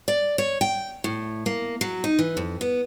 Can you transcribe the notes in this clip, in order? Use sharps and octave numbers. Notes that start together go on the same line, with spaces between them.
D5
C#5
G5
A2
A#3
F#3
D#4
E3
F2
B3